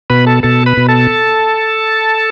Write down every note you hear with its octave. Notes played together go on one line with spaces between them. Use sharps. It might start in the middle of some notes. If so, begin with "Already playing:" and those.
B2 B4 B5
A4 A5
B2 A4 A5
B4 B5
B2
A4 A5